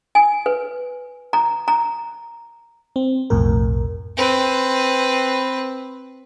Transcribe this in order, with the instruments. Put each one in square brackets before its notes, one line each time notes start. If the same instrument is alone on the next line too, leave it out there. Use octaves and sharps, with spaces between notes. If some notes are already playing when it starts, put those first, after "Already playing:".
[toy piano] G#5
B4
A#5
A#5
[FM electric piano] C4
B1 F2 A2 A#4
[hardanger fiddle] C4 B4